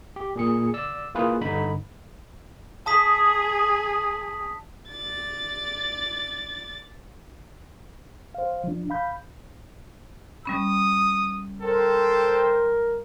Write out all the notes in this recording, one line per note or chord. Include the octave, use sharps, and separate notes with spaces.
G4
A#2 G#4 C#7
D5 E6
A#3 E4 F4 G#4 B4
G2 D3 D#4 B5
G#4 A5 D#6 B6
D5 A6
C5 F5
F3 D4
F5 B5 G6
G3 C#4 B5 D#6
A4 A#4 C5 G5